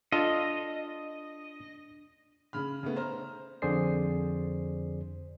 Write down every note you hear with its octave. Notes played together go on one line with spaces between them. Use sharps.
D4 F4 A4 D#5
C#3 B5 F6
C#3 A3 B3
C5 A#5 F6
F2 D3 G#4 C5 D5 C7